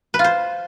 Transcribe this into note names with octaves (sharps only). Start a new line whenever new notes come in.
B4
F4
C5